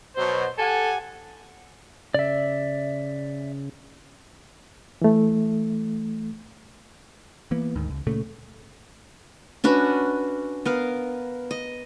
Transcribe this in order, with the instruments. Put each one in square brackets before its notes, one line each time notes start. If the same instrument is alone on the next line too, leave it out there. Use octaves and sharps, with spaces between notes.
[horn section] B2 F#3 [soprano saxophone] C5
[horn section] G4 F#5 G#5 [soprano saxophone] A4
[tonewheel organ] C#3 [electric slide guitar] D5 E5
[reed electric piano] E3 A3
[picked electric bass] E3 A#3 B3
D2 G#2 D#3
C#2
A#2 C#3 A3
[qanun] C#4 D4 F#4 B4
B3 A#4 F5
D#5